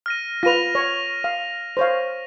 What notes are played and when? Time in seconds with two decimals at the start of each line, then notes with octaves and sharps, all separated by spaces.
0.06 F6 A#6 D#7
0.43 F4 B4 A#6 D#7 F7
0.75 C#5
1.24 F5
1.77 C5 C#5 F5